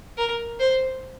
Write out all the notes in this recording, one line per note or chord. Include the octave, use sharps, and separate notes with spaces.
A#4
C5